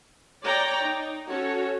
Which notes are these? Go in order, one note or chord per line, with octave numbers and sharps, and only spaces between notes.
C#5 D5 G5 A#5
D#4
C#4 F#4 A4 C#5